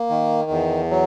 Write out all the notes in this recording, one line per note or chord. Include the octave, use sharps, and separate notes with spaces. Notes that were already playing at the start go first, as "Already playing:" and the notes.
Already playing: A#3
D#3
E2
F#3